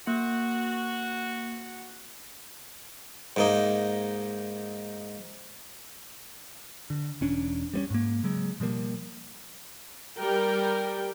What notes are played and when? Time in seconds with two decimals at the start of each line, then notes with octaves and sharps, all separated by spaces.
0.07 A#3 F#4
3.36 G#2 A#3 D#4
6.90 D3
7.21 E1 C#4 D4
7.73 G3 B3 C#4
7.90 G#2 A#3
8.23 C#3 F#3 G#3
8.60 B2 F3 G3 A#3
10.17 G3 A#4 G5